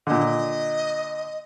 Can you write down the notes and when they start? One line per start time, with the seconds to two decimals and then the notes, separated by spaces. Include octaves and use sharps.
0.07 A#2 D3 D#5